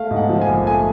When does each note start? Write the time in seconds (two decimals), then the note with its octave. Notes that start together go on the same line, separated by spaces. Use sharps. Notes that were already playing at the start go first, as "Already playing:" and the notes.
Already playing: A3 F5
0.11 G#2
0.16 F#5
0.29 F3
0.42 G#5
0.48 A#1
0.67 A3 G#5